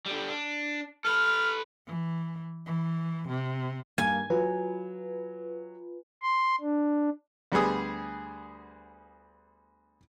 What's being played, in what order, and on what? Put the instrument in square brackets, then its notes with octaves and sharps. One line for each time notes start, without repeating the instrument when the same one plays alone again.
[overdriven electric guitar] D3 G3
D4
[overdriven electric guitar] A4 B4 [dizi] F6
[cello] E3
E3
C3
[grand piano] G2 A#3 G#6 [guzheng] G#5
[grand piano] F#3 [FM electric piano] F4 B4
[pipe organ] C6
D4
[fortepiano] D2 G3 B3 G#4 D#6